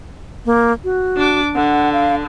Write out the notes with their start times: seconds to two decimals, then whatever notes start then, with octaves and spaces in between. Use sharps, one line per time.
0.46 A#3
0.84 F#4
1.16 D4 D6
1.55 D3 F#5
1.93 F5